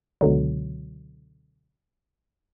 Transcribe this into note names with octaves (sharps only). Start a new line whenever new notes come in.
C#2 B2 D3 F#3